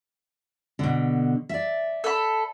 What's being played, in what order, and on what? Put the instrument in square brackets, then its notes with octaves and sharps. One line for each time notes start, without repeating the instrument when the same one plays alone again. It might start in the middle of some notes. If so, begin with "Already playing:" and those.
[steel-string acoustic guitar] B2 D3
D5 E5
[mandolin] A4 B5